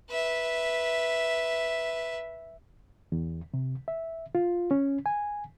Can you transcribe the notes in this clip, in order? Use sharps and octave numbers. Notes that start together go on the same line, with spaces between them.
B4 E5
E2
C3
E5
F4
C#4
G#5